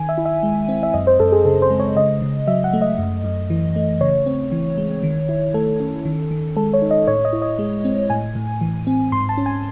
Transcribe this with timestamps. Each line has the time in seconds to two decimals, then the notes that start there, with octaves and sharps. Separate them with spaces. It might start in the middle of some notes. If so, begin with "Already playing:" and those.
Already playing: D#3 G#5
0.09 E5
0.18 E4
0.25 E5
0.43 G#3
0.68 C4
0.83 E5
0.94 F#2 D#5
1.07 C5
1.20 F#2 A4
1.32 G#4
1.45 C#3 A4
1.62 C5
1.71 G#3
1.80 C#5
1.96 C#3 D#5
2.22 C#3
2.47 F#3 E5
2.64 F#5
2.73 A3
2.82 D#5
2.98 F#2
3.24 F#2
3.50 E3
3.76 A3
4.01 C#3 C#5
4.26 C4
4.52 E3
4.78 G#3
5.03 D#3
5.29 E4
5.54 A3 A4
5.80 C#4
6.05 D#3
6.31 D#3
6.56 G#3 A4
6.73 C#5
6.82 D#4
6.91 D#5
7.07 A2 C#5
7.25 D#5
7.33 E4
7.42 D#5
7.59 G#3
7.84 C4
8.10 A2 G#5
8.35 A2
8.61 E3
8.87 C4
9.12 G#2 C6
9.29 A5
9.37 C#4
9.46 G#5